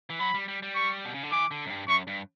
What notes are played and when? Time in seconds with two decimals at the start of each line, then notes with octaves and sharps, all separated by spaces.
0.10 E3
0.20 F#3 B5
0.34 G3
0.48 G3
0.63 G3
0.75 C#6
1.05 B2
1.14 C#3
1.23 D3
1.32 E3 D6
1.51 D3
1.66 F#2
1.70 G2
1.88 F#2 C#6
2.07 G2